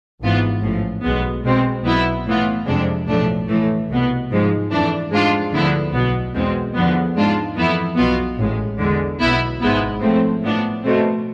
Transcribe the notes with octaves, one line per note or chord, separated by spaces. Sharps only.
G#1 G#2 E3 B3 F4
A1 A2 F3
B1 B2 G#3 B3
B2 G#3 C4
B1 B2 B3 E4
A2 E3 B3 F4
F2 C3 G#3 D4
B1 A2 F3 A3 D4
A2 E3 A3
C2 B2 B3
G#2 F3 G#3
F2 E3 A3 D4
G#2 G#3 D4 F4
D2 D3 F3 B3 E4
B1 B2 B3
E2 B2 G#3 C4
E2 D3 F3 B3
G#2 G#3 D4 F4
F2 E3 B3 E4
B1 B2 B3 F4
A1 A2 G#3
E2 D3 G#3
B1 B2 B3 E4
G#1 G#2 G#3 B3 E4
A2 F3 A3 C4
A2 F3 B3 D4
B2 A3 C4